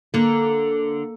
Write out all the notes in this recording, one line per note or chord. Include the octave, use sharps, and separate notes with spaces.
D3 A#3